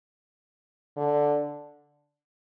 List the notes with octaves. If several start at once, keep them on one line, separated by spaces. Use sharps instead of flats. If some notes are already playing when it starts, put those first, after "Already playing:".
D3